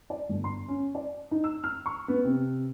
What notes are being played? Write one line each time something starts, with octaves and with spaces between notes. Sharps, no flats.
D5
G1
C6
C#4
D5
D#4
E6
F6
C#6
B3
C3